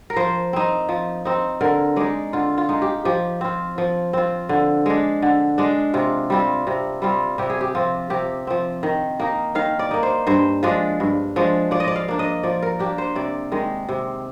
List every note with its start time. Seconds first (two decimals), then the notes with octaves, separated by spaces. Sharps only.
0.10 A#4
0.16 F3 C5
0.53 C4 D#4
0.89 F3
1.25 C4 D#4
1.61 D3 A#4
1.96 G#3 D#4 D5
2.33 D3 F4
2.58 F4
2.69 G#3 D#4
2.82 G4
3.05 F3 G4
3.41 C4 F4
3.78 F3
4.13 C4 F4
4.49 D3
4.86 G#3 D4
5.22 D3
5.58 G#3 D4
5.94 C3 F4
6.30 G3 C4 F4
6.67 C3
7.02 G3 C4 F4
7.38 C3 G4
7.50 G#4
7.61 G4
7.75 F3 C4 F4
8.10 C3 G4
8.47 F3 C4
8.83 D#3
9.20 A#3 D#4
9.55 D#3 F5
9.79 D5
9.91 A#3 D#4
10.03 C5
10.27 G2 C5
10.63 F3 G#3 D4
11.00 G2
11.36 F3 G#3 D4
11.71 F3 D5
11.80 D#5
11.87 D5
11.96 F5
12.08 A#3 D4
12.19 D#5
12.43 F3 D5
12.62 A#4
12.79 A#3 D4 G4
12.98 C5
13.15 C3 D5
13.52 D#3 G#3
13.89 C3